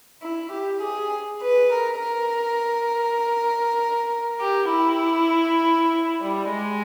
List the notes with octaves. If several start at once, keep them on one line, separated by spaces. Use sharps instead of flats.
E4
G4
G#4
B4
A#4
A#4
G4
E4
G3
G#3